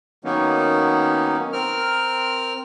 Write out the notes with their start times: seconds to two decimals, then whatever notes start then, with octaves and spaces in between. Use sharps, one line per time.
0.25 D#3 F#3 A#3 B3 C#4 D#4
1.53 C4 A#4 F6